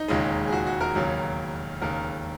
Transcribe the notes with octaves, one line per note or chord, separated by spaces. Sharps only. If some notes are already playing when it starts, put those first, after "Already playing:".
Already playing: D#4
E1 D#2 C#3 G#3
G#4
F#4
F#4
A#4
E1 D#2 C#3 F#3
E1 D#2 C#3 A#4